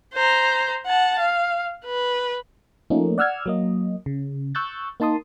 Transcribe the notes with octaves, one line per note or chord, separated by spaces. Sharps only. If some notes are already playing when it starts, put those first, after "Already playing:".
C5 A#5
F#5 A5
F5
B4
F3 A3 A#3 C#4 D#4
D5 F#5 E6 F6 G#6
F#3 A#3 D#5
C#3
C#6 E6 F#6 G6 A6
A#3 D#4 A5 C6 D#6